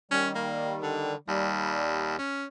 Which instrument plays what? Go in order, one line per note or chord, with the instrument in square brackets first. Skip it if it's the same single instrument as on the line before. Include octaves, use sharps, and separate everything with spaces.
[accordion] D#3 G3 [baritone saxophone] C#4
[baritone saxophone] A#3
D3
[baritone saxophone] D#2 [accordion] G3
[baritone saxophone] C#4